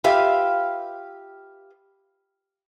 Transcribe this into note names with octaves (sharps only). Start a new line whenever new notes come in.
F4 G4 B4 E5 F5